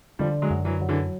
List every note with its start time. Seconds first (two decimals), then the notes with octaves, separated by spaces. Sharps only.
0.19 D3 F3 G3
0.42 F#3 G#3
0.50 F#2
0.65 E3 F#3
0.81 F#3
0.89 D3 E3